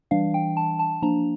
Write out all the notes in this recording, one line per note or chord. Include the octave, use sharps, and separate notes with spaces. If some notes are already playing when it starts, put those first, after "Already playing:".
E3 G3 D4 F5
G5
A5
A5
F3 A#3 D4 A#5